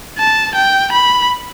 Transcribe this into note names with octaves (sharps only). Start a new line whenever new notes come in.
A5
G5
B5